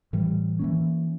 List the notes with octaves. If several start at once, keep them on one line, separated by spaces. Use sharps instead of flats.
A2 E3 G3
E3 A#3 C#4